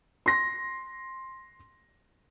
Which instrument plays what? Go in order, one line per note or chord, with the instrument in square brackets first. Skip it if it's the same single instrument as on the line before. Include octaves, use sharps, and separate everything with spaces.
[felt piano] C6 A#6